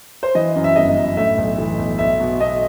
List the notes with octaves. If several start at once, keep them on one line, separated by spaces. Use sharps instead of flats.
C5
E3 D#5
F#2
E5
G1 D#5
F#2
A2 E5
B1
E3
B1
B1 E5
B2
B2 D#5